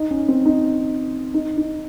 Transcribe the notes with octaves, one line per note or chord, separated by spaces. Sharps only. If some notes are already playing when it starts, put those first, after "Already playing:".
Already playing: D#4
C#4
C4
D#4
D#4
D#4